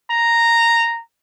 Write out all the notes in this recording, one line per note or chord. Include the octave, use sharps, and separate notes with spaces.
A#5